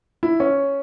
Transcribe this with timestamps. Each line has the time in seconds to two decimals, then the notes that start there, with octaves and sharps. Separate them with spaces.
0.23 E4
0.40 C#4